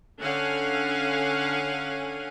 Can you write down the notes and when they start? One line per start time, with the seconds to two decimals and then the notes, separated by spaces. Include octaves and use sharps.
0.21 D3 C#4 F5 F#5 G#5